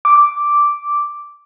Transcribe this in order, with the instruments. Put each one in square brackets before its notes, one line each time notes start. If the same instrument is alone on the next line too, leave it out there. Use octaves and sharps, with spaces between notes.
[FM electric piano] D6